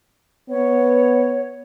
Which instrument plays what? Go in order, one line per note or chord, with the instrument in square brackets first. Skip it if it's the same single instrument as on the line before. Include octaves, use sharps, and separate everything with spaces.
[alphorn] B3 [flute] C#5